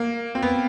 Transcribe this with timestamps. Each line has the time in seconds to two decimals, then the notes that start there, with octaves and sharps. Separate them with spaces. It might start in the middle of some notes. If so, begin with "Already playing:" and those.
Already playing: A#3
0.35 C4
0.42 B3